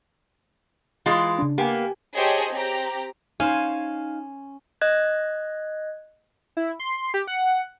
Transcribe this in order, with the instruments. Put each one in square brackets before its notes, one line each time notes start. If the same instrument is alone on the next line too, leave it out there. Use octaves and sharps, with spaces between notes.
[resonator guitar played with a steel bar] E3 G#3 F4
[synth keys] C#3 D4
[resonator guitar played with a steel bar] A#3 B3 [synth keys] G4 G5 G#5
[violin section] G4 G#4 C5 C#5 D#5 A5
C4 G4 A#5
[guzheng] C#4 C5 [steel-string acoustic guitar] D#4 [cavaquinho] F5 [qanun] G#5
[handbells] D#5 F#6 G#6
[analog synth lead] E4
C6
G4
F#5